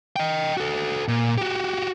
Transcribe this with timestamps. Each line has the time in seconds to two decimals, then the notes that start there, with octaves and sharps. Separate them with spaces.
0.16 D#5 G5
0.57 F#4 A4
1.08 A#2
1.38 F#4 G4